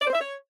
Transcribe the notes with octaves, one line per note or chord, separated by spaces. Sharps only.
D5
C5
E5
C#5